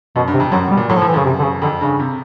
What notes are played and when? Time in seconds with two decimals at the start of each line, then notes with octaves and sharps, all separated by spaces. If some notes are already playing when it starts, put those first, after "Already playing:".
0.16 F#2 B2
0.28 G2
0.34 C3
0.40 F2
0.52 F#2 F#3
0.68 B2 G3
0.77 A#2
0.89 A2 F#3
0.98 F3
1.02 A2
1.07 E3
1.14 F#2 C#3
1.25 C3
1.39 D3
1.44 C#3
1.62 F2 D3
1.81 G2 C#3
1.99 C3